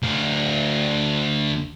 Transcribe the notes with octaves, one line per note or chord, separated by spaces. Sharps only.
D2 F5